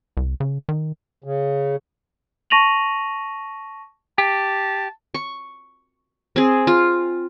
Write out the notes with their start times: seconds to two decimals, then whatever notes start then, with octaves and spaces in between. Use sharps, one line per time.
0.17 C2
0.40 C#3
0.69 D#3
1.24 C#3
2.50 A5 C#6 A#6 D#7 F7 F#7
4.18 G4 A5
5.14 C#6
6.36 C4 G#4
6.67 F4